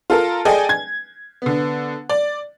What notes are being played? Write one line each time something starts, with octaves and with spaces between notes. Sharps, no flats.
F4 A4 A#4
G#4 A4 D5 D#5 G5 G#5
G#6
D3 B3
D5